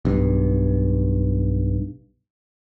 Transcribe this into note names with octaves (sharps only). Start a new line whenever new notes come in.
B1 G2